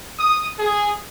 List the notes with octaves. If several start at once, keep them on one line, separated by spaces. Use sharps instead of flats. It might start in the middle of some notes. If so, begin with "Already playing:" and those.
D#6
G#4